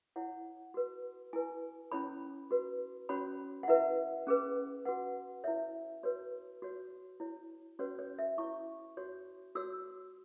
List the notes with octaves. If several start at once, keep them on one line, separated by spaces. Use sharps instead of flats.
E4 C#5 F#5
F#4 B4
E4 B4 G#5
C#4 E4 C#5 B5
F#4 B4
C#4 F#4 C#5 B5
F#5
E4 B4 E5
C#4 G#4 B4
F#4 B4 F#5
E4 C#5 E5
F#4 B4 C#5
F#4 C#5
E4 C#5
C#4 F#4 B4 C#5
C#5
E5
E4 C#5 C#6
F#4 C#5
F#4 C#5 E6